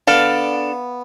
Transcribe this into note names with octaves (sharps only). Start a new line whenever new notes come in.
B3 D4 A4 D5 F5